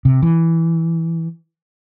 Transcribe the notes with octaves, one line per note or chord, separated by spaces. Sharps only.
C3
E3